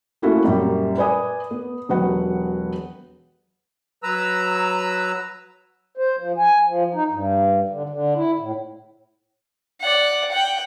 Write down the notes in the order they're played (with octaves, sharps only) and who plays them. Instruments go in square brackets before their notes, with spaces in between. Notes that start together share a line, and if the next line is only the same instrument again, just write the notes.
[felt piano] A3 A#3 C#4 E4 F#4 A4
F#2 A#2 G3
B4 D5 G#5 D#6
B3
E1 F#3 G4 B4 F#5
[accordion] F#3 B4 A#5 E6
[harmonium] C5
F3
G#5
F3
D#4
G2
D3
D3
E4
A2
[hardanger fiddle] D5 F#5
F#5 G5